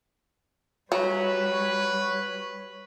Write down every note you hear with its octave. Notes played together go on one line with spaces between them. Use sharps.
F#3 G3 B4 C#5